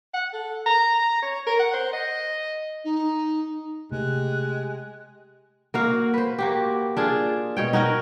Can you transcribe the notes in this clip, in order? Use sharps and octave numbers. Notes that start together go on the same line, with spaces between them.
F#5
A4
A#5
C#5
A#4
F#5
C5
D#5
D#4
C3 G#3 A3 G4 F#6
A#3 F#4 F5
B4 C5
A#3 F#4 G4
D4 F4 G#4
B2 C#5 G5
D#4 F#4 A#4 D#5